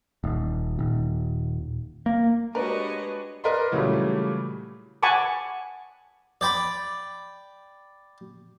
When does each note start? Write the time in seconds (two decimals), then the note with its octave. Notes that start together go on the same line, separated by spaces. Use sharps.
0.24 D#1
0.79 D#1
2.06 A#3
2.55 G#3 D4 F#4 G4 A#4 B4 C#5 D#5
3.44 A#4 B4 D5 D#5 B5 C6
3.72 A#2 C#3 E3 F#3 G3 A3
5.03 F#5 G#5 A5 B5 C#6 D6
6.41 D5 G5 B5